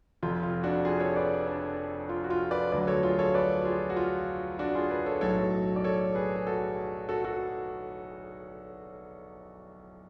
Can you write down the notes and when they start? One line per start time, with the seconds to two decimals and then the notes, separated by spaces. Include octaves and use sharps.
0.23 F1 F2 F3 F4
0.43 F4
0.63 D4 F#4
0.85 F4 G#4
1.00 A4 C#5
1.16 B4 D5
1.47 D4
2.09 F4
2.24 F#4
2.30 F4
2.51 B4 D5
2.72 D2 D3 F#3 B4 D5
2.87 A4 C#5
3.03 F4 G#4
3.19 A4 C#5
3.34 B4 D5
3.65 F4 G#4
3.90 F#4
3.96 F4
4.59 D4 F#4
4.75 F4 G#4
4.91 G#4 B4
5.06 A4 C#5
5.21 B1 A2 F#3 A4 C#5
5.76 D5
5.84 A4 C#5
6.15 G#4 B4
6.36 G#4
6.47 F#4 A4
7.09 F#4 A4
7.24 F#4 A4